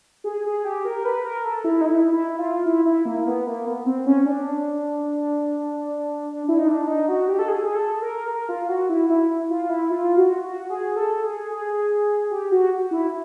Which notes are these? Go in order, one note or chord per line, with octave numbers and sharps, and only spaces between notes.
G#4
G#4
G4
A#4
B4
A#4
A4
E4
D#4
E4
E4
F4
E4
E4
A#3
B3
A#3
B3
C4
C#4
D4
E4
D#4
D4
D#4
F#4
G4
A4
G#4
G#4
A4
A#4
A#4
F4
F#4
E4
E4
F4
E4
F4
F#4
F#4
G#4
A4
G#4
G#4
G4
F#4
E4